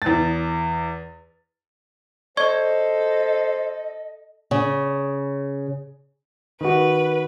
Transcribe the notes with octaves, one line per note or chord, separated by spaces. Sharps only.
E2 A6
A4 C5 D5 D#5 C#6 G#6
C#3
D#3 F#4 B4